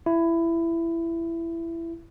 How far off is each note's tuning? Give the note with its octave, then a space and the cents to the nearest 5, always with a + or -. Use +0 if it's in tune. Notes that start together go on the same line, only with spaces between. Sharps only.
E4 +15